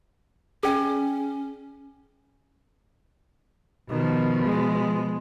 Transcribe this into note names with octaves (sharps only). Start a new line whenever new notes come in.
C#4 G#4 D5 G5
B2 D#3 F3
G#3